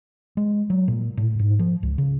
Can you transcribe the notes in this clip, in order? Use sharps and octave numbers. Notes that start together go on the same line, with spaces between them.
G#3
F#3
A#2
A2
G#2
F3
C#2
C#3